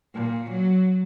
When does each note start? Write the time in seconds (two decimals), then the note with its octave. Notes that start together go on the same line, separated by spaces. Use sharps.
0.15 A#2
0.51 F#3